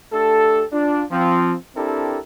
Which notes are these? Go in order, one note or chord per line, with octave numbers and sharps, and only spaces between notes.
A3 D4 G4 A4
D4 F4
F3 C4
C4 D4 E4 G4 A4 A#4